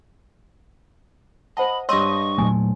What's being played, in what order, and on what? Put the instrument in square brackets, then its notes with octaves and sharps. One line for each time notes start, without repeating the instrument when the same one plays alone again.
[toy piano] C5 F#5 A5 [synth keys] D#5 [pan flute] B5
[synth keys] G2 D#5 [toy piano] C#5 C6 E6 [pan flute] C#6
[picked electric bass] A#2 F#3 A3 [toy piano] G#5